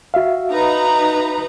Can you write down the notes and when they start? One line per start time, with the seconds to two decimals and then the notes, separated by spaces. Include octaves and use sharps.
0.14 F#4 E5 F5
0.51 D#4 B4 A#5